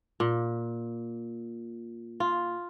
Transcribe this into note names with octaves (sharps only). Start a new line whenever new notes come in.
A#2
F4